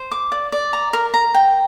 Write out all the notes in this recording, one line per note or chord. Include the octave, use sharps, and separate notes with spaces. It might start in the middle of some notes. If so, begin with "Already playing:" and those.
Already playing: C5
D6
D5
D5
A#5
A#4
A#5
G5